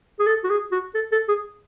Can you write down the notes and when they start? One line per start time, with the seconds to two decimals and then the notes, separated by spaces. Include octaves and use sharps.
0.20 G#4
0.27 A4
0.44 F#4
0.50 G#4
0.72 F#4
0.95 A4
1.12 A4
1.28 G#4